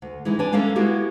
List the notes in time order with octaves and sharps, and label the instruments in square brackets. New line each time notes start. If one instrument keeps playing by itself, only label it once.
[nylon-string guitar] D2
E3 G#3 D#4 E4
D4 B4 C#5 G#5
G#3 A#3 C#4 A4 E5
G#3 A#3 B3 E4 F#4 G4